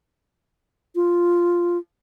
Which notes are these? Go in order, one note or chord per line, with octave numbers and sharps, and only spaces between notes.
F4